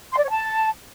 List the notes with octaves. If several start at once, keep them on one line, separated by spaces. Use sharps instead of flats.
C6
D5
C#5
A5